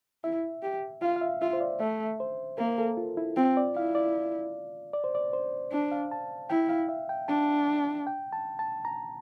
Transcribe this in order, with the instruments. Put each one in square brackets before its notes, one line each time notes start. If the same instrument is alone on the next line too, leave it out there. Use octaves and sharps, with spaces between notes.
[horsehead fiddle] E4 [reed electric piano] E5
[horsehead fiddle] G4
[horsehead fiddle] F4 [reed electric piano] F5
[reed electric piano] F5
E5
[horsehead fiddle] F4 [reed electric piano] E5
[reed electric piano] C5
D5
[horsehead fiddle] A3 [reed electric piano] E5
[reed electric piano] C5
[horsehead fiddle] A#3 [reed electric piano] A#4
[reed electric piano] A4
F4
E4
[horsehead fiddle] C4 [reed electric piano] F4
[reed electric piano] D5
[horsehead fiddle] E4 [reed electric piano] F5
[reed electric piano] D5
D5
C5
D5
C5
[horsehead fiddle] D4
[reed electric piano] F5
A5
[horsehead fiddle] E4 [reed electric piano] G5
[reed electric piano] F5
E5
G5
[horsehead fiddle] D4 [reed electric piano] A5
[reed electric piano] G5
A5
A5
A#5